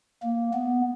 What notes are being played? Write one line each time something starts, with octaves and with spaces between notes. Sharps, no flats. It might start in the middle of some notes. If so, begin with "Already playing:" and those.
A#3
B3